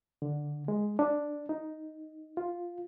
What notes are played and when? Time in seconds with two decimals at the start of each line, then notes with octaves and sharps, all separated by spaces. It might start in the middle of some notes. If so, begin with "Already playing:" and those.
0.22 D3
0.68 G#3
0.99 D4
1.49 D#4
2.37 F4